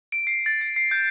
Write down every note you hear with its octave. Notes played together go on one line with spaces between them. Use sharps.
D7
C7
A6
C7
C7
G6